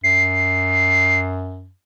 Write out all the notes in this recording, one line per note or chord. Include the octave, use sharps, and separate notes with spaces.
F#2 C7